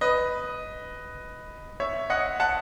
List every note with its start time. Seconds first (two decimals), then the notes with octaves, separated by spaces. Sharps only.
0.01 B4 D#5
1.80 C#5 E5
2.10 D#5 F#5
2.40 F#5 A5